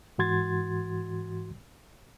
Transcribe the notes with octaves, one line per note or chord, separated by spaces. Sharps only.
G#2 E3 F#4 C6 G#6 A6